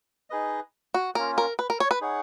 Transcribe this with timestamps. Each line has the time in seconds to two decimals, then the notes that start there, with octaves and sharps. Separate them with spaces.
0.30 D#4 G#4 B4 D#5
0.94 F#4
1.15 A#3 C#4 F4 A#4
1.38 A#4
1.59 B4
1.70 A#4
1.80 C#5
1.91 B4
2.01 D#4 G#4 C#5 F#5